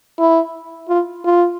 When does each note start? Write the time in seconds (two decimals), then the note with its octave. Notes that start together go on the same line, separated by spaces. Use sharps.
0.19 E4
0.89 F4
1.25 F4